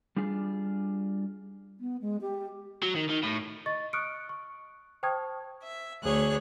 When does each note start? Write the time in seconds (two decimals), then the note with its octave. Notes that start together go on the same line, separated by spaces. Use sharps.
0.17 G3 D4 F4 G#4
1.80 B3
2.01 G#3
2.21 G4
2.83 F#3
2.96 D#3
3.10 D#3
3.24 A2
3.66 D#5 C#6 A6
3.93 C#6 D#6 F6 F#6 C#7 D7
4.29 C#6
5.03 C5 G5 A5 C#6 D#6 G#6
5.64 E5
6.04 D2 G#4 C#5 F#6